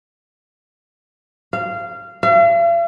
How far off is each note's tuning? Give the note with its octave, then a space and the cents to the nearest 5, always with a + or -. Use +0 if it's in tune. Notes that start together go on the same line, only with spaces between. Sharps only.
F5 -20
F5 -45